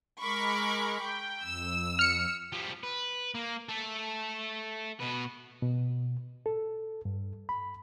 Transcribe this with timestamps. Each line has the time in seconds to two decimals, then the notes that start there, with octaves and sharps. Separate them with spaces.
0.22 G#3 A#4 B5 C#6 D6
0.98 G5
1.43 F2 E6
1.99 F6 C#7
2.52 F3 G3
2.83 B4
3.35 A#3
3.69 A3 A4
5.00 B2 B4
5.62 B2
6.46 A4
7.05 G2
7.49 B5